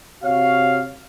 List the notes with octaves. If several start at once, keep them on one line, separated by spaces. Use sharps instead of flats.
C3 F#4 C#5 F5